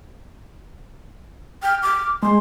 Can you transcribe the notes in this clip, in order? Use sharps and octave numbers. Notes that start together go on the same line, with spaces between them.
G5 F6
D6
G#3 C6